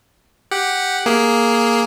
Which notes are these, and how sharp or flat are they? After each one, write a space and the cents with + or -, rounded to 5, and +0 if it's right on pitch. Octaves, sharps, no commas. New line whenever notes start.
G4 +0 F#5 +0
A#3 +0 G#4 +0